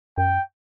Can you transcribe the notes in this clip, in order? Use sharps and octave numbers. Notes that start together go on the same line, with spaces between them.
F#2 G5